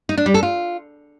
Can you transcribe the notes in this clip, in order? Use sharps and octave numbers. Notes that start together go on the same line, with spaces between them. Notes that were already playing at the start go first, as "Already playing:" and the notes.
D#4
D4
G3
A4
F4